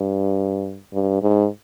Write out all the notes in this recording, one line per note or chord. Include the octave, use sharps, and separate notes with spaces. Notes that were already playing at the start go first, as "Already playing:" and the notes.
Already playing: G2
G2
G#2